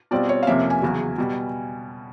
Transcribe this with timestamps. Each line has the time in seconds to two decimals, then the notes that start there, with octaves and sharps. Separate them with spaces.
0.11 B2 G3 C4 F4 D5
0.29 C#5
0.43 F5
0.47 F2 C3 F3 A#3 C#4 E5
0.70 G#5
0.82 E2 C#3 F#3
1.18 B2 G3